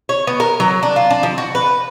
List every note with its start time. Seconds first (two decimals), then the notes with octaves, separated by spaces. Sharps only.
0.09 C#5
0.27 B3
0.40 A#4
0.60 F#3
0.83 D4
0.96 F4
1.10 D4
1.23 F3
1.38 F#4
1.55 B4